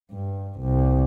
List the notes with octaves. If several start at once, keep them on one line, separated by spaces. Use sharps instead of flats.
G2
C2